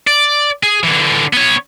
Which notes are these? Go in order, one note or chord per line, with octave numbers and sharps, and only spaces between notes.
D5
G#4
D3 E3
B3 C#5